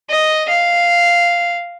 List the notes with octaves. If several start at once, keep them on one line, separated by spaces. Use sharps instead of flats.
D#5
F5